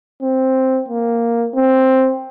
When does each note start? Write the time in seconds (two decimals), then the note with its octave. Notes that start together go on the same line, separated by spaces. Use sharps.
0.22 C4
0.88 A#3
1.55 C4